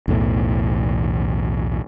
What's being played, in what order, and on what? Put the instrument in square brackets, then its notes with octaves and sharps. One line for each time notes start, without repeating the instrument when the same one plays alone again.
[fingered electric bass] B1 E2 A2 E3